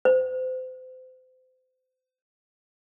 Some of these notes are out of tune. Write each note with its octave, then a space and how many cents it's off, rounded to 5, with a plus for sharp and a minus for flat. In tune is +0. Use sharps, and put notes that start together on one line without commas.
C5 -35